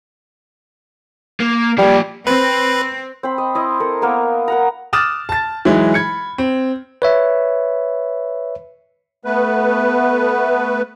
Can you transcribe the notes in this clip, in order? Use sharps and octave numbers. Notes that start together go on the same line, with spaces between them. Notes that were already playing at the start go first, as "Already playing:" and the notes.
A#3
F3 G3 A#3
C4 B4
C4 C5 B5
D#5
E4 D#5
A4 A#4
A#3 B3 A#4 F5
A#4 F#5 A#5
D6 D#6 F6 F#6 A6 E7
A5 A6
E3 F#3 G#3 D#4 E4
B5 G#6 C#7
C4
B4 C#5 E5
A3 B3 B4